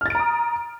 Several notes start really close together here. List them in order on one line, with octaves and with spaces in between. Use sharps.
F6 A6 D7 A#5 D#6